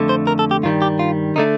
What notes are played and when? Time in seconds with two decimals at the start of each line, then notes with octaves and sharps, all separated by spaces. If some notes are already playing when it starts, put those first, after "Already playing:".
Already playing: F2 D3 A3
0.09 C5
0.27 A#4
0.39 A4
0.51 G4
0.63 G2 D#3 G3 F4
0.82 G4
0.99 F4
1.36 D3 A3 D#4